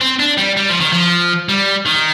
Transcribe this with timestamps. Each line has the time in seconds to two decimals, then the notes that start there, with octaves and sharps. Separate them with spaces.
0.01 C4
0.20 D4
0.38 G3
0.57 G3
0.69 F3
0.80 D#3
0.92 F3
1.49 G3
1.86 D#3